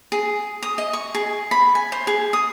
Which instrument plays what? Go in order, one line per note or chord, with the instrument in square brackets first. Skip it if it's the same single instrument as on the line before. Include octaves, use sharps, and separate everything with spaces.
[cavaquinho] G#4
D#6
D#5
C#6
G#4
B5
G#5
C5
G#4
D#6